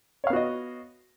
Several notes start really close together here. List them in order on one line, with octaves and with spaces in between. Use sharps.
C#5 F5 B3 F#4 D#5